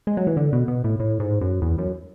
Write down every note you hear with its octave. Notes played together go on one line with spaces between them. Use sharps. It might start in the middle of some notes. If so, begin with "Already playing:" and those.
G#3
F#3
E3
D3
B2
B2
A2
A2
G#2
F#2
E2
F#2